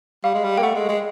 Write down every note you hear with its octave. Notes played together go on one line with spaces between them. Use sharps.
G3 F5
G#3
G3
A#3 G5
A3 F#5
G#3
G#3